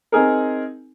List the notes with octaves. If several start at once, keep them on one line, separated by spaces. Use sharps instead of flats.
C4 D#4 G#4 A#4